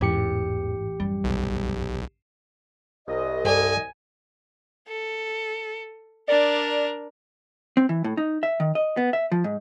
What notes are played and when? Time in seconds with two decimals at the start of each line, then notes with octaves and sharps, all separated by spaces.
0.01 A1 E2 G#2 G4 C#7
1.00 F#2 G3
1.24 B1
3.08 C2 D#5
3.45 G2 A4 D5 G#5
4.88 A4
6.28 D4 A#4 D5
7.77 C4
7.89 E3
8.04 A2
8.17 D#4
8.43 E5
8.60 D#3
8.75 D#5
8.97 B3
9.13 E5
9.32 F3
9.44 G#2